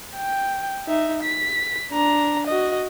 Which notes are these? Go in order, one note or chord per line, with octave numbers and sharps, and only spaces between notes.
G5
D#4 E5
B6
D4 A#5
F#4 D#5